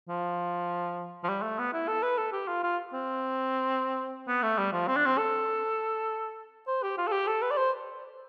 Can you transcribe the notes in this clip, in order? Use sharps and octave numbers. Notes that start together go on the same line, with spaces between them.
F3
F3
G3
A3
B3
E4
A4
B4
A4
G4
F4
F4
C4
B3
A3
G3
F3
C4
D4
C4
A4
C5
G4
F4
A4
G4
A4
B4
D5
C5